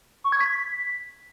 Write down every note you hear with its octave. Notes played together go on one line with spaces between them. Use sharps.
C#6
G#6
B6